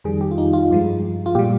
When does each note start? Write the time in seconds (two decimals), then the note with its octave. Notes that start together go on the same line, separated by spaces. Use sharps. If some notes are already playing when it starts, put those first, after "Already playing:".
0.04 F2 D#3 G3 G#4
0.21 G4
0.31 F4
0.38 D#4
0.53 F4
0.71 G2 F3 G#3
1.26 F4
1.35 A#2 G3 G4